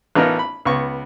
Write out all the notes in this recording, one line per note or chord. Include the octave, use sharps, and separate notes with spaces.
A1 B3 D#4 F4 A#4
B5
C#2 B3 C#6